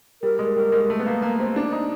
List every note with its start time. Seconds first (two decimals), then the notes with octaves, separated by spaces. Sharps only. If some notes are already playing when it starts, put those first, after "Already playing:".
0.22 G3 A#4
0.39 G#3
0.55 G3 A#4
0.72 G#3
0.90 A3
0.99 B3
1.07 A#3
1.22 A#3
1.40 C4
1.56 D4
1.72 D#4